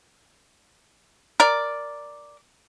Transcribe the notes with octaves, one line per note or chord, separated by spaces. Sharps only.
A#4 D5